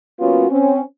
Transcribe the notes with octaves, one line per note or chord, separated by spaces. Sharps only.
F#3 A#3 B3 C#4 F4 F#4
C4 C#4